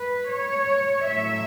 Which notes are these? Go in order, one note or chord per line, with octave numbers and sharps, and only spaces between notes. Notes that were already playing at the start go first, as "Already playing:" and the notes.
Already playing: B4
C#5
A2 F#3 E5